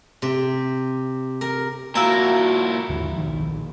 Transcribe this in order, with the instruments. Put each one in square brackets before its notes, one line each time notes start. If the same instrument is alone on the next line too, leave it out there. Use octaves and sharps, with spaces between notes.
[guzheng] C3
A#4
[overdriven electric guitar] A#2 E4 [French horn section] F#4 [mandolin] A#4 F5 E6
[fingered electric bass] D#2 G#2 D3 F3
F#1 B1 F2 D#3
A#1